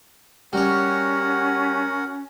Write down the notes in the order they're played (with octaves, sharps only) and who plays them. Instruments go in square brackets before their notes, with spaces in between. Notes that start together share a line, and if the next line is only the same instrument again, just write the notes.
[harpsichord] G3 C#5 [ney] C#4 [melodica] F#4 A#4 F#5